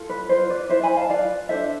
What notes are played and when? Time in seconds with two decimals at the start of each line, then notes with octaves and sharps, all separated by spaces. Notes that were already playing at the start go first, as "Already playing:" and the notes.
Already playing: F4 A4
0.09 B4
0.29 F4 B4 C5
0.49 B4 D5
0.69 E4 B4 C5 E5
0.83 G#5 B5
0.97 F5 A5
1.09 F4 B4 D5 F5
1.49 D4 A4 C5 E5